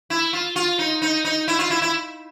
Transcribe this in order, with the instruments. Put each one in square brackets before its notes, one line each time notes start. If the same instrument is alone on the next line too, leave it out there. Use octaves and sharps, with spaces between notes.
[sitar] E4
F4
F4
D#4
D#4
D#4
E4
F4
E4
E4